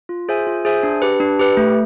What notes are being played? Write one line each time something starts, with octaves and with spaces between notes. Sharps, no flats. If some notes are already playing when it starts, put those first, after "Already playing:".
F4
G#4 C5 E5 G#5
F4
G#4 C5 E5 G#5
D4
G4 B4
D4
G4 B4
A3